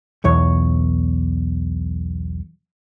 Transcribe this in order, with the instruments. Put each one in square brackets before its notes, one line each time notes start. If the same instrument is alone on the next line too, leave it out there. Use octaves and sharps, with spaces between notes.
[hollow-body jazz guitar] B1 E2 C#5